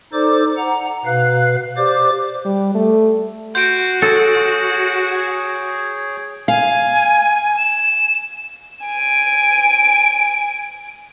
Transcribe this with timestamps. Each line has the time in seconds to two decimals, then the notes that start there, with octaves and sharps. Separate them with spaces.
0.13 D#4 A4 C5 D5 D6
0.57 F#5 A#5
1.05 B2 B4 F5 F#6
1.77 G4 C5 D5 D6
2.45 G3
2.75 A3
3.55 F#4 F#5 C6 G6 D7
4.02 G#4 A4 C#5
6.48 F5 G#5
7.57 E7
8.86 G#5 D7